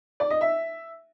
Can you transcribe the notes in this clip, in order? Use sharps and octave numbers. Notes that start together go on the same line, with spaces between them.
D5
D#5
E5